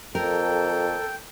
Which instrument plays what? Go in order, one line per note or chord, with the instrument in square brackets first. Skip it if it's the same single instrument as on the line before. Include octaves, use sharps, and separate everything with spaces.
[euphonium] F2 [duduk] A4 [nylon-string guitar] A#4 [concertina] G5